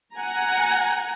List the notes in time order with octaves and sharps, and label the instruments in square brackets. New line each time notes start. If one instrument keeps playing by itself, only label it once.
[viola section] F#5 G#5 A#5